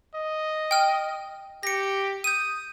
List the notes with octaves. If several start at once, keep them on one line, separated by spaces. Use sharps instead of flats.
D#5
G5 F6
G4 A#6 C#7
D#6 G6 D#7